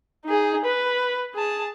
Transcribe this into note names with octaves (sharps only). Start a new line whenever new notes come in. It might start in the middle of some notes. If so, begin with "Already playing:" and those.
D#4 G#4
B4
G#4 A5